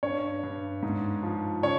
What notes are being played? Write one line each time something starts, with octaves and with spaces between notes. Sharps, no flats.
G2 C#5
G2
G#2
F3
C#3 C#5